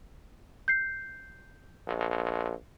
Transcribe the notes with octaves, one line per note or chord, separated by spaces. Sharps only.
G6 C7
A#1